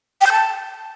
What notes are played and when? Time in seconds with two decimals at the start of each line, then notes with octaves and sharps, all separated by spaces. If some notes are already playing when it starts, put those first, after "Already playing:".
0.21 G5
0.26 G6
0.32 A5